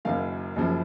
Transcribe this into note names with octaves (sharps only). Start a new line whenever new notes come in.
F#1 F#2 D#3 F5
F#1 F#2 C#3 F3